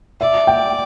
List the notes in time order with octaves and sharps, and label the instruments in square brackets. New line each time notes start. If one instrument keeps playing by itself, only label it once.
[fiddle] D5 [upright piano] E5
[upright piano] G5